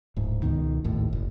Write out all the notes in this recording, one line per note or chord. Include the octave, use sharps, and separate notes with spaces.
D1 G#2
C#2 B2 D#3
G#1 D#2 A2
F#1